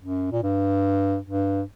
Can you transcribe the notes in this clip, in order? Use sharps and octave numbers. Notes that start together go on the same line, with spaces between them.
F#2
A#2
G2
G2